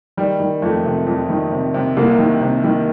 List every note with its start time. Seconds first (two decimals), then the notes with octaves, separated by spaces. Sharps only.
0.17 D#3 G3
0.40 D#3
0.62 F2 A3
0.85 C3
1.07 F2
1.29 D#3
1.52 C3
1.74 C3
1.97 C2 A#3
2.19 D#3
2.41 C3
2.64 D#3